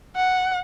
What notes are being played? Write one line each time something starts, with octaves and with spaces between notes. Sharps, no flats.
F#5